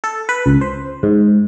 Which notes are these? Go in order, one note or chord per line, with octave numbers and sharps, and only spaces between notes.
A4
B4
C#2
C5
G#2